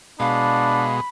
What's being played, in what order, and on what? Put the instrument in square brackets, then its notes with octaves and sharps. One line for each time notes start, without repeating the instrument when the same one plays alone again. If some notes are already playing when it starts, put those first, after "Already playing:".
[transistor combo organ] B2 G#3 [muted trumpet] D4 [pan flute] F5 [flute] B5